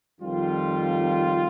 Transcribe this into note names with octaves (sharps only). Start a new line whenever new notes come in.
F2 D#3 G3 F4